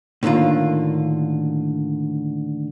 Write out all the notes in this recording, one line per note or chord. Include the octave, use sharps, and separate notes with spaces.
A2 D3 D#3 A#3 F4